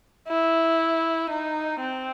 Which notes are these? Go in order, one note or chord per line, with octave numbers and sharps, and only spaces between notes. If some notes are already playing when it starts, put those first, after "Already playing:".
E4
D#4
C4